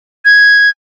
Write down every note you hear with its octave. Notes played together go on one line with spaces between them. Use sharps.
G#6